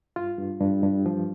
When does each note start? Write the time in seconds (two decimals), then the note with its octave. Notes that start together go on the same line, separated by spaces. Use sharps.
0.16 G2 F4
0.38 G2
0.61 G2
0.83 G2
1.06 F3